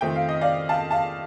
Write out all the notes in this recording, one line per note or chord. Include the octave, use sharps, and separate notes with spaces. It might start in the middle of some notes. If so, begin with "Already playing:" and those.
F2 D#3 A3 C4 G5
F5
D#5
D5 F5
F5 A5
F5 A5